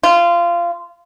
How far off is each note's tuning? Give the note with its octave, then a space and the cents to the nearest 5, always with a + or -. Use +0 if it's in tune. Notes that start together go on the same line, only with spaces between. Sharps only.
F4 -20